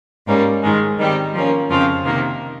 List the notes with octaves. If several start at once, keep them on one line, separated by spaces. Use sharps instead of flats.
G#2 G3 A#3 C#4
G#2 D#3 G#3
D#3 G3 C4 G4
F3 A#3 C#4
F2 C#3 F3 C4 F4
C3 D#3 A#3